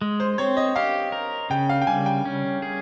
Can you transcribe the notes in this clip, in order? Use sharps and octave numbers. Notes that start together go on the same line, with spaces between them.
G#3
C5
C4 C#5
D#5
G4 F5
A#4
C#3 G5
F5
G5
G3 G#5
G5
C#4
G#4